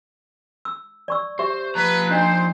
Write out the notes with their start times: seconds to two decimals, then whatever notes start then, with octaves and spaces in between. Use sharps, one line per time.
0.65 E6
1.08 D5 C#6 E6
1.39 G4 C5 E5 C#6
1.76 F3 B4 A#5
2.11 D4 D#4 C5 D#5